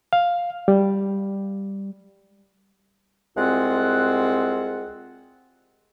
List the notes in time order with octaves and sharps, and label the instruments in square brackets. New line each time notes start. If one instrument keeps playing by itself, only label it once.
[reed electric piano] F5
G3
[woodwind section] C2 G#3 C4 F4 F#5